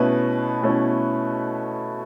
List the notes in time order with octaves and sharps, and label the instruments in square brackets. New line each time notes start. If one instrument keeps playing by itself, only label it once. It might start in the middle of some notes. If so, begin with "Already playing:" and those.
Already playing: [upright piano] B2 A3 C#4 E4 B4
B2 A3 C#4 E4